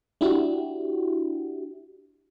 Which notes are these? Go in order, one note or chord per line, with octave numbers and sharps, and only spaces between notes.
D4 E4 F#4 G4